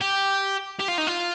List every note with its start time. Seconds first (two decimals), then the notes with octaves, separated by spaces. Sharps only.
0.01 G4
0.80 G4
0.88 F4
0.98 D#4
1.07 F4